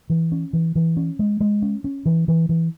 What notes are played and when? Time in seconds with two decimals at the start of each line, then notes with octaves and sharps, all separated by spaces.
0.10 E3
0.32 C#4
0.53 E3
0.75 E3
0.97 C#4
1.19 G#3
1.40 G#3
1.62 C#4
1.84 C#4
2.06 E3
2.28 E3
2.49 E3